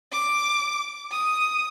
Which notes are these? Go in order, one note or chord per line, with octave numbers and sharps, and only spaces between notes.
D6
D#6